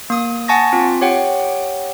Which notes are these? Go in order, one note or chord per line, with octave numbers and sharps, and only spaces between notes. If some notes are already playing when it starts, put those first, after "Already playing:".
A#3 D#6
F#5 G#5 A5 C#6 A6 A#6
C4 F4
G4 C#5 F#5 G5